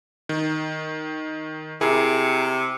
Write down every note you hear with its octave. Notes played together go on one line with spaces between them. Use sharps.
D#3
C3 E4 G#4 A#4